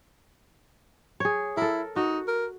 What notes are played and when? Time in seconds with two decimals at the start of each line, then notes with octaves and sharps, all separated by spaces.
1.20 G#4 C#5
1.57 E4 A4 A#4
1.96 D#4 F#4
2.28 A#4